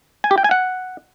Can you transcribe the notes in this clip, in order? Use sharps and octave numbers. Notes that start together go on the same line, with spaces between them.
G#5
G4
G5
G#5
F#5